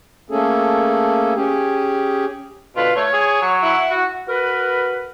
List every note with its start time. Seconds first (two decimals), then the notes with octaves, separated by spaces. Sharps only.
0.30 A3 A#3 C#4 G#4 A4
1.35 C#4 G4 G#4
2.76 B2 D3 F4 B4
2.96 A3 C#5
3.13 G#4
3.42 F#3
3.63 E4 F#5
3.90 F#4
4.28 F#4 A#4 B4